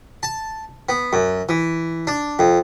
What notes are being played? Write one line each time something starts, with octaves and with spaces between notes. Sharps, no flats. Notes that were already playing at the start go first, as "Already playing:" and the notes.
A5
B3
F#2
E3
D4
F2